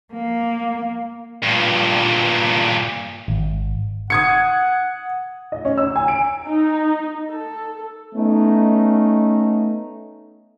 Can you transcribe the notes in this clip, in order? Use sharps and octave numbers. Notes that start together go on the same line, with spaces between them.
A#3
G2 A#2
G#1
F#5 D#6 G#6 C#7
D#5
C#4
E6
G#5
D7
D#4
A4
A3 B3 C#4 D#4